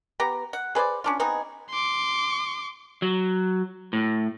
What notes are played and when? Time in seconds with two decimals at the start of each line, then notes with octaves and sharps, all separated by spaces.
0.20 B3 G4 A#5
0.53 F#5
0.75 G#4 B4 C5 D5
1.04 C#4 D4 F4
1.20 B3 C4 D#4 G#4
1.70 C6 D6
3.02 F#3
3.93 A2